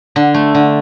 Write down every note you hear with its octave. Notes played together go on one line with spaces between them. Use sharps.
D3
A3
D3